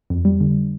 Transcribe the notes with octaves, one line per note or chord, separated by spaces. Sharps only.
F2
G3
D3